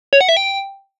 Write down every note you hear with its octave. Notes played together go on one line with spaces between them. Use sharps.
C#5
F#5
E5
G5